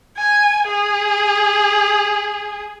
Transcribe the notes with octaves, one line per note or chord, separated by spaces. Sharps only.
G#5
G#4